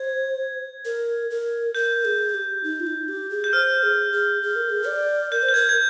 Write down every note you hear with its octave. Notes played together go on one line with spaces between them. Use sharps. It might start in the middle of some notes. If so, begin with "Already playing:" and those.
Already playing: C5 G#6
A#4
A#4
A#4 G6
G#4
G4
D#4
F4
D#4
G4
G#4
G6
C5 F6
G#4
G#4
G#4
A#4
G#4
D5
A#4 G6
C5
G6
A#4 G#6
G#6